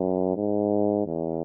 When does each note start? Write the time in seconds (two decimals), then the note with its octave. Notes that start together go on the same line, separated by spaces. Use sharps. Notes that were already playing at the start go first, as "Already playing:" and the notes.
Already playing: F#2
0.36 G#2
1.06 E2